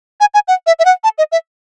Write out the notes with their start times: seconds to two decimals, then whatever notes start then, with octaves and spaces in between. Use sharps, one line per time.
0.20 G#5
0.34 G#5
0.48 F#5
0.67 E5
0.79 E5
0.85 F#5
1.04 A5
1.18 D#5
1.32 E5